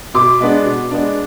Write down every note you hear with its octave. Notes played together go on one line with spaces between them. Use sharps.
B2 C6 D6
G#3 B3 D4
B2
G#3 B3 D4